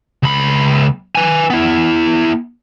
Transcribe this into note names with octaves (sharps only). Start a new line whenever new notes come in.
C#2 B5
B4 G#5
B3 E4